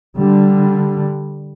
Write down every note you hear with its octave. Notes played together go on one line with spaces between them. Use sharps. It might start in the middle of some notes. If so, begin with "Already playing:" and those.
D3 G3